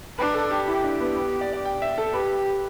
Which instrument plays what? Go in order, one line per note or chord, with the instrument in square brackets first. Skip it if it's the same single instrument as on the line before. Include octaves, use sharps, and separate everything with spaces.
[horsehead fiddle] D4 [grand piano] B4
[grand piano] A4
G4
[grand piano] E4 [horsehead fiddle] G4
[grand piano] D4
B3
B3
D5
D5
G5
E5
A4
[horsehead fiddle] G4 [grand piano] B4